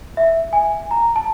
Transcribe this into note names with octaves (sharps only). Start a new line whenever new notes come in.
E5
G#5
A#5
A5